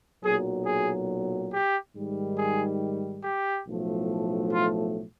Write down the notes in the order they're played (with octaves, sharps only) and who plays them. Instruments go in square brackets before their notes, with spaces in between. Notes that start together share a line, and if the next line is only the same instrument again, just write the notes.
[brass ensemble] B1 A#2 F#3 G#4
G#4
G4
G#2 D#3 G3
G#4
G4
B1 A2 F3 A3
F4